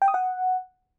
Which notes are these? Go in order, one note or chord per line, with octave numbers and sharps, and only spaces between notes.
G5
D#6
F#5